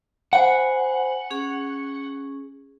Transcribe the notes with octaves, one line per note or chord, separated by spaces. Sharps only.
C5 F#5 G#5 B5
C#4 G#4